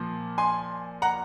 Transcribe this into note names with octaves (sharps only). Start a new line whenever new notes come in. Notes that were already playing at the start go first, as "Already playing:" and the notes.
Already playing: A#2 F3
G#5 C6
F#5 A#5